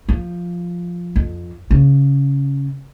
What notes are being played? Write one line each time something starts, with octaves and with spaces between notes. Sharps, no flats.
F3
F2
C#3